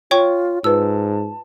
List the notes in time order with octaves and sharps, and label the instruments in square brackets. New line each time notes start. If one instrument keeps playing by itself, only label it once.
[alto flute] F4 [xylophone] C#5 G5 C#6
[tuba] G#2 [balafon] F4 B4 [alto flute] A5 [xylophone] E6